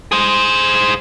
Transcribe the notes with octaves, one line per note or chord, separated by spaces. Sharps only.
G#4 C5